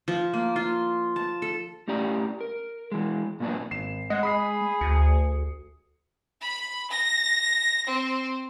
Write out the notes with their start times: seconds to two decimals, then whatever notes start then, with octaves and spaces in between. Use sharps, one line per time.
0.08 F3
0.34 A#3
0.56 F4
1.16 A5
1.42 A4
1.88 A2 C#4 G4 D5 A#5
2.41 A#4
2.92 E3 G#3
3.40 A#2 F#3 A#3 B3 D4
3.71 G#1 C7 E7
4.10 G#3 D#5 F#5
4.23 G#4 B5 D#6 C7
4.81 D2 C#7
6.41 B5
6.90 A#6
7.87 C4